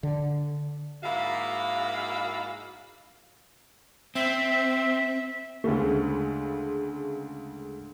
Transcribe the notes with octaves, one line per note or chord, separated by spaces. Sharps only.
D3
G#2 A#3 E4 F#4 F5
C4 E5
D2 C#3 G#3 A3